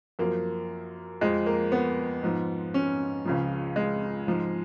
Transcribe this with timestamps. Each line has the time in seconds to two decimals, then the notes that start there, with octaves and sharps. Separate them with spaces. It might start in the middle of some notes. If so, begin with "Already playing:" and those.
0.19 F#2 F3 A#3
1.21 F2 F3 G#3
1.46 A#3
1.72 B3
2.23 G#2 F3
2.74 C#4
3.25 C#2 C#3 F3
3.76 G#3
4.27 G#2 F3